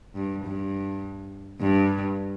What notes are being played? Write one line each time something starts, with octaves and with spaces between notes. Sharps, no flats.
G2
G2
G2